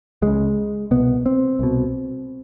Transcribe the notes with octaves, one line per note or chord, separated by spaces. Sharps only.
C#2 C#3 G#3
C2 B2 B3
C4
C2 B2